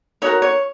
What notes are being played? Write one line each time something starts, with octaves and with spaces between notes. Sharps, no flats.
D#4 F#4 A#4 C#5
C#5